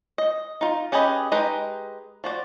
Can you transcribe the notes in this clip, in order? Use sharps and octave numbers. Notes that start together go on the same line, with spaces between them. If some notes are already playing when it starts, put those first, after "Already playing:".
D#5
D#4 F4
C#4 G4 G#4 B4 D#5
G#3 D#4 G4 B4 A#5
F3 F#4 D5